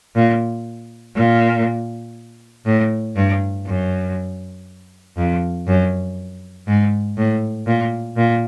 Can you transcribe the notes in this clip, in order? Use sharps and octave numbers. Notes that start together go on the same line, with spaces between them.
A#2
A#2
A2
G2
F#2
F2
F#2
G#2
A2
A#2
A#2